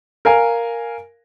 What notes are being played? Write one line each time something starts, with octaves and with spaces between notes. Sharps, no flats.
A#4 F5 G#5